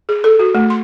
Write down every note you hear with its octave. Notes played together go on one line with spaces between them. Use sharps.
G#4
A4
F#4
A3
C6